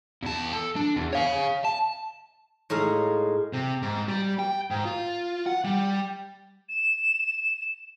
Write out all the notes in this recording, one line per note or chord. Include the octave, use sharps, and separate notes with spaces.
E2 A5
A4
D4
E2
C#5 F5
A5
A2 G#3 D#4 F5
C3
G#2
G3
G5
G#2
F4
F#5
G3
E7